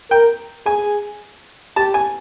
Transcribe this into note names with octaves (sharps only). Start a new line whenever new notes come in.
A#4 G5
G#4 G#5
G4 A5
G#5